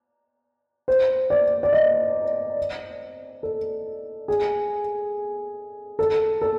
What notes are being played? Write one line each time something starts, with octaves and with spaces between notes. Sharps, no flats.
C5
D5
D5
D#5
A4
G#4
A4
A4